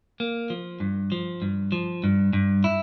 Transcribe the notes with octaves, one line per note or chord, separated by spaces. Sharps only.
A#3
F3
G2
F3
G2
F3
G2
G2
E4